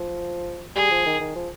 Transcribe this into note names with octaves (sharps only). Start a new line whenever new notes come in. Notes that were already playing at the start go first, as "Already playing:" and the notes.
Already playing: F3
G3 G#4
F3
D#3
D#3
F3